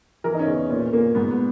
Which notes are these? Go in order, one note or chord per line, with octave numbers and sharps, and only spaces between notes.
E3 A#4
D#4
C#4
E2
A#2 C#4
A#2 A#3
G#2 B3
B3